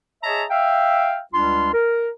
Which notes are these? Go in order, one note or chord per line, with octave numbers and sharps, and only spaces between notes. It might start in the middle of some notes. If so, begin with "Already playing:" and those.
G#4 C#5 D#5 E5 A5 A#5
E5 F5 G5
C#2 G3 D4 F4 C6
A#4